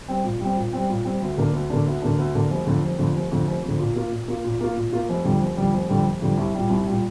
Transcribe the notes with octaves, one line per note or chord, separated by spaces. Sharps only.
G3 C4
A#2
G3 C4
A#2
G3 C4
A#2
G3 C4
D2
D3 A#3 D4
D2
D3 A#3 D4
D2
D3 A#3 D4
D2
D3 A#3 D4
F1
F2 D3
F1
F2 D3
F1
F2 D3
F1
F2 D3
A#2
A#3 F4
A#2
A#3 F4
A#2
A#3 F4
A#2
A#3 F4
F1
F2 D3 G3
F1
F2 D3 G3
F1
F2 D3 G3
F1
F2 D3 G3
C2
A#2 G3
C2
A#2 G3